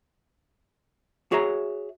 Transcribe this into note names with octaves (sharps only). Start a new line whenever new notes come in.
F#4 G#4 C#5 E5 A#5